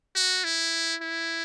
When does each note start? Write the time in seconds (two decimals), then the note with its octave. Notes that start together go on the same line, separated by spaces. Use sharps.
0.15 F#4
0.44 E4
1.02 E4